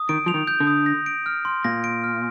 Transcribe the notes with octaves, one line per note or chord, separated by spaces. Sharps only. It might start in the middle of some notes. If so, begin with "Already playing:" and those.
Already playing: D#6
D#3 D7
F3 F7
D#3
G6
D3
D#6
A#6
D7
F6
C6
A#2 A#6
D7
F6